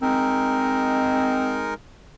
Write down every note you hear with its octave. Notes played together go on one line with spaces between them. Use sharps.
G#3 C4 D#4 A#4